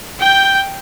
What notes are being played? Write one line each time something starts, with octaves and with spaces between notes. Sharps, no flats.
G5 G6